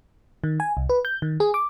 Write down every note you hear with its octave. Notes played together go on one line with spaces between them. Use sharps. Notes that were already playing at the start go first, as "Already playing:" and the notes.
D#3
G#5
C2
B4
G6
D#3
G#4
D6